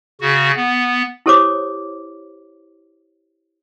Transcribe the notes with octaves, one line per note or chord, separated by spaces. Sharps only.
C#3 F#4
B3
E4 G4 A4 C5 C#5 D6